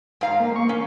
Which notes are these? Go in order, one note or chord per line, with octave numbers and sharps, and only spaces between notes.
G#2 F5 A#5
A#3
C#6
A#3 C#4